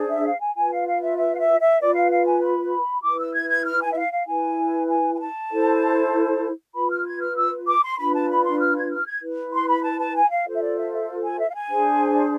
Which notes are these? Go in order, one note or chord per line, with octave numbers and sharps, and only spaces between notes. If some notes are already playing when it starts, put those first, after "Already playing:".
Already playing: D4 G#4 C5
E5
F5
G#5
F4 B4 G#5
F5
F5
E5
E5
F5
E5
E5
F4 B4 D5
F5
F5
G#5
B5
E4 B4 D6
E6
G#6
G#6
F6
G#5
E5
F5
F5
E4 B4 G#5
G#5
G#5
A5
E4 A4 C5
F4 B4 B5
F6
G#6
F6
E6
D6
C6
D4 F4 B4 B5
A5
B5
C6
F6
G#6
F6
G#6
E4 B4
C6
B5
A5
A5
G#5
F5
F4 A4 C5
E5
D5
E5
E5
G#5
E5
F5
G#5
D4 G#4 C5